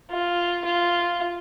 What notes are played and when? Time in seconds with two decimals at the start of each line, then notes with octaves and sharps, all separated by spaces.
0.11 F4
0.65 F4